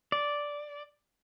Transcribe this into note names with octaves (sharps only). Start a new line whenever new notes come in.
D5